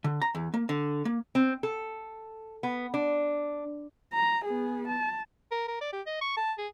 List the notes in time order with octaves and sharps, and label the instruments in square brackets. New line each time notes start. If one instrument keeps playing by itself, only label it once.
[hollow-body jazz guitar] D3
A#5
E2
A#3
D3
A#3
[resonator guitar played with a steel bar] C4
A4
B3
D4
[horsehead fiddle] A#5
B3 G#4
A5
[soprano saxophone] A#4
A#4
D5
G4
D#5
C#6
A5
G#4